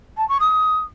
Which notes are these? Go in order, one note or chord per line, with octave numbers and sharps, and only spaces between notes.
A5
C#6
D#6